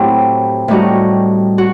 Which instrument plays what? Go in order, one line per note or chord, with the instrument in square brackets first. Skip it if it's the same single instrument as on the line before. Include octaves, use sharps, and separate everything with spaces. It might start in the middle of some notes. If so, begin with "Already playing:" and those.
Already playing: [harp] A2 F#3 C4 E4 G4 [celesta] G5
[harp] A2 G3 D#4 F#4
F#4